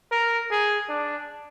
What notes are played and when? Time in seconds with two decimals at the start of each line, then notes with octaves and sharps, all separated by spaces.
0.11 A#4
0.51 G#4
0.89 D4